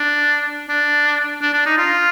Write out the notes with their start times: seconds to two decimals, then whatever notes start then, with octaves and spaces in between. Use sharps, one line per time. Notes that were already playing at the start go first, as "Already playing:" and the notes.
Already playing: D4
0.69 D4
1.41 D4
1.53 D4
1.66 D#4
1.78 F4